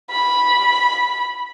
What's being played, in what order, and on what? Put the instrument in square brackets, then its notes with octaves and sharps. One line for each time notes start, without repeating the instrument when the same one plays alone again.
[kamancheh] B5